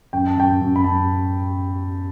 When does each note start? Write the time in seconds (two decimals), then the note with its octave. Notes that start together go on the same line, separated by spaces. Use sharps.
0.13 F#2 G5
0.27 A5
0.37 F#2 G5
0.61 F#2
0.76 B5
0.84 F#2 A5